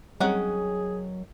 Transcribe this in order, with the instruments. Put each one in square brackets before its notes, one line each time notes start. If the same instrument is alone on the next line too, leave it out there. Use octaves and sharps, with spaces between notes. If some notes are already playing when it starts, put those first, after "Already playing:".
[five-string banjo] D#3 C#4 F#5 [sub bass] F#3 [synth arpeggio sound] G3 C4 F#6 [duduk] G#4